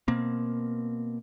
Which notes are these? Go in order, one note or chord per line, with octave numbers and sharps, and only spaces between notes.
B2 A#3 C4